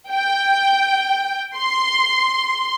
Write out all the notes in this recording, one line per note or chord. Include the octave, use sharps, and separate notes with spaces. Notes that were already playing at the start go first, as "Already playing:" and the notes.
G5
C6